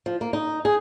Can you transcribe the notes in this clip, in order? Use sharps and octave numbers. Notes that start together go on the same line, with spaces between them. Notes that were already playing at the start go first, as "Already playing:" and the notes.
F3
A#3
D#4
G#4